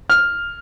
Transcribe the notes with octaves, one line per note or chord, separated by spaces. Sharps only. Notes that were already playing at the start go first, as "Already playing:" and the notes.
F6